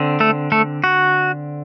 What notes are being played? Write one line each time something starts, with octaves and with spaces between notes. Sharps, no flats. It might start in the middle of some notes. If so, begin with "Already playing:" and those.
Already playing: D3 C4
A3 A4
A3 A4
F#4